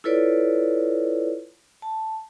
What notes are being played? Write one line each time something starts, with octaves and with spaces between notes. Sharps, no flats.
E4 F4 A4 B4 C#5 D5
A5